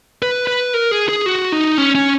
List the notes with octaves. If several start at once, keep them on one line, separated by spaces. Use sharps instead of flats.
B4
B4
A#4
G#4
G#4
F#4
D#4
C#4
C#4